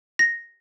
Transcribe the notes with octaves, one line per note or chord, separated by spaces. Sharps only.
A#6